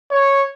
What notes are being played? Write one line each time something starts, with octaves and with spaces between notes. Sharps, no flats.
C#5